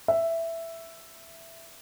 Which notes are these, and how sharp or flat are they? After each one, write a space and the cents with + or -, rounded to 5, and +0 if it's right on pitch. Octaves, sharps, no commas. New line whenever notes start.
E5 +5